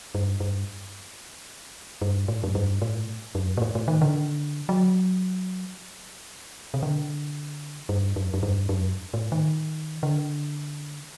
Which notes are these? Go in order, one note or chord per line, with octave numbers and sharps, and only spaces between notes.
G2
G2
G2
A2
F#2
G2
A2
F#2
A#2
A2
A2
D#3
D3
F#3
C3
D3
G2
F#2
F#2
G2
F#2
A2
D#3
D3